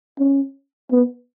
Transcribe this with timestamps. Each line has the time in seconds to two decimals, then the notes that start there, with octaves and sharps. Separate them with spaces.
0.19 C#4
0.92 B3